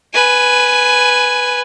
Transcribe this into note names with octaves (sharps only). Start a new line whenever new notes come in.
B4 G#5